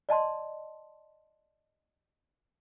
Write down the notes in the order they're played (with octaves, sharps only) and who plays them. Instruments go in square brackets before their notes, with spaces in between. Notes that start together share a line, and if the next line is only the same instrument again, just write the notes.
[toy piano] D5 D#5 A5 C6